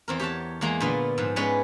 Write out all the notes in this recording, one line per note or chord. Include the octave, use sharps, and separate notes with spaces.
E2 C4 A#4
G4 C#5 F#5 A5
E2 G#3 A#3 A#5
A#2 D3 B3 F4 C6
G#2 F3
G#3 B3 C#4 B4 C#5 D5